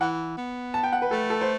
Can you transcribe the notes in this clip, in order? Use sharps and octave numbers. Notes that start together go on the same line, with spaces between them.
E3 F#5
B3
A5
G5
F#5
B4
A3 A4
A4
C5